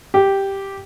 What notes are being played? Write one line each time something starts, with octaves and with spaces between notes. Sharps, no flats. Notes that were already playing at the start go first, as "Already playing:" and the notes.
G4